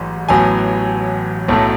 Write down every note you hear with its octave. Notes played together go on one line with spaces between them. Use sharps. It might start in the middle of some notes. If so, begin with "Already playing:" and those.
Already playing: A1 G#2 F#3
A1 A2 F#3 B3 G#5
B1 A2 F#3 A3